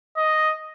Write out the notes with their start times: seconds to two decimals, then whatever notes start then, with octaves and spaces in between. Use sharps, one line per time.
0.17 D#5